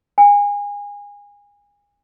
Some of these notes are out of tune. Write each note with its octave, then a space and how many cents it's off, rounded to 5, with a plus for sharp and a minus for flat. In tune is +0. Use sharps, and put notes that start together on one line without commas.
G#5 -25